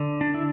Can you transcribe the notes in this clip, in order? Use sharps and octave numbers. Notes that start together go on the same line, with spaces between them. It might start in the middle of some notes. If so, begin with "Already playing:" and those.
Already playing: D3
D4
E4